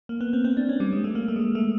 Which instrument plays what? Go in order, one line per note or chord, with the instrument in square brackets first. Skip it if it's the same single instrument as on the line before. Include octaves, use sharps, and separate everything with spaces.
[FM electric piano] A#3
B3
C4
C4
D4
C#4
G3
G#3
A3
A#3
A3
G#3
A3
A3